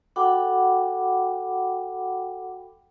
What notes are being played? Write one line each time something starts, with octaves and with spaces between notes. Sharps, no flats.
F#4 A4 F#5 G5 B5 D6